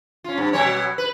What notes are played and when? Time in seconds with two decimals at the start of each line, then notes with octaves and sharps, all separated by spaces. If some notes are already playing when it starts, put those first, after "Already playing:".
0.24 C#4 F4
0.38 G2
0.53 B2 F#3 C#5
0.98 B4